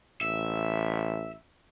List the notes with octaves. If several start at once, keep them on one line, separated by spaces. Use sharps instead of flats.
A1 E5